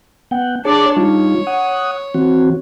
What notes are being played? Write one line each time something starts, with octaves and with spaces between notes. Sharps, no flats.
B3 F#5 G5
D4 G#4 C#5 D5 A5
G3 D#4 F4 C#5
F#5 D#6
E3 C4 F#4